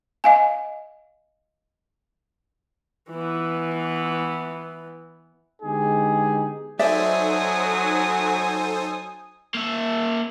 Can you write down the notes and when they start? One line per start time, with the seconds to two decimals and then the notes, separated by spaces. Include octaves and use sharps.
0.24 D#5 F5 G#5
3.10 E3 B3
5.62 D3 G#3 B3 D#4 G4 G#4
6.79 F#3 D#4 A4 C5 D5 E5 G#5 D#6
9.54 A#3 E5